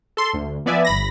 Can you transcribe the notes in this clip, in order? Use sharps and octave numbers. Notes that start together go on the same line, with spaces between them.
A4 C6
D2
F3 B3 D5 E5 G#5
G1 B5 A#6